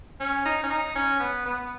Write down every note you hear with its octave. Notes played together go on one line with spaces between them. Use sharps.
C#4
D#4
C#4
D#4
C#4
B3
B3